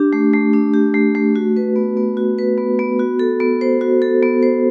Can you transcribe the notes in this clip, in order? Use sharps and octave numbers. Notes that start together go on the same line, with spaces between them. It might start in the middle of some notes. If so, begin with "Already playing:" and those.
Already playing: D4 G4
A3
A3
D4
G4
A3
A3
F#4
B4
B3
B3
F#4
B4
B3
B3
F#4
A4
B3
C5
F#4
A4
B3
C5